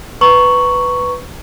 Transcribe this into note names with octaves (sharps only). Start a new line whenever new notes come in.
B4 A#5 C#6 F#7